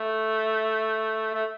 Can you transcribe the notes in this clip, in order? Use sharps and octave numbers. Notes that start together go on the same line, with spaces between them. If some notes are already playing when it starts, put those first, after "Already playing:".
Already playing: A3
A3